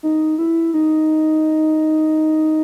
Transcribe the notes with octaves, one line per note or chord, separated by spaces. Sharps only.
D#4
E4
D#4